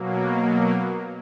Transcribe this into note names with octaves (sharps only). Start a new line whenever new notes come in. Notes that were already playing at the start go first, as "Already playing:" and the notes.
Already playing: B2 F#3 A#3